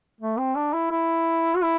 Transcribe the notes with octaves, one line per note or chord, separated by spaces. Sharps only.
A3
C4
D4
E4
E4
F#4
E4